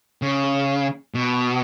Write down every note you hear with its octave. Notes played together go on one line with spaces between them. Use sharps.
C#3
B2